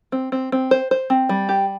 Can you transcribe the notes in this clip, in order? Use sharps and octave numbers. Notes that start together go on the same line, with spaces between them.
C4
C4
C4
C5
C5
C4
G3
G4